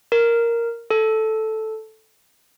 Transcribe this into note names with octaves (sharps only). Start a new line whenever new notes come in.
A#4
A4